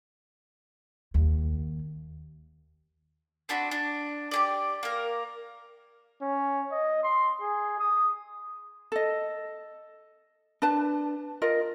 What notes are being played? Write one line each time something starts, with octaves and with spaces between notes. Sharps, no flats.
D#2
C4 D4 F#4 B5
D4
G4 G#4 D5
A#3 A#4
C#4
D#5
C6
G#4
D#6
A4 D#5
D4 B4 A5
F4 A#4 D#5